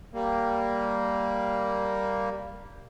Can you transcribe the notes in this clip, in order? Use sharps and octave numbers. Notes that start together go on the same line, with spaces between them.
G3 A#3